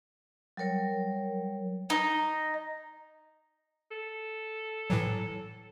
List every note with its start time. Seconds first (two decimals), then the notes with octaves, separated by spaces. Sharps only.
0.57 F#3 G3 A#4 C#5
1.90 D#4
3.91 A4
4.90 A2 E3 F#3